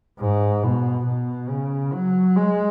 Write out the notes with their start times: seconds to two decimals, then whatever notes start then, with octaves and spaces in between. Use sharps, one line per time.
0.20 G#2
0.63 B2
1.06 B2
1.50 C#3
1.93 F#3
2.36 G#3